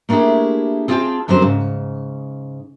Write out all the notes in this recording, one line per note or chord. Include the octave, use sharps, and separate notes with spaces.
A3 A#3 D4 E4 G4 G#4
C4 F4 G#4 C#5 G5 A5
F#2 D3 F#3 C4 C5
G#2 C#3